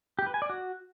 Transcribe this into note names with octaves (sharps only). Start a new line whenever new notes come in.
G4
B4
G#5
D5
F#4